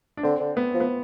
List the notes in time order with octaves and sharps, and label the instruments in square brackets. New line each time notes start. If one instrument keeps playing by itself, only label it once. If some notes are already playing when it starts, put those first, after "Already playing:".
[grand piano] D4
[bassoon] D3 [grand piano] C4
[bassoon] D3
[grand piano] B3
[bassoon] F3
[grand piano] B3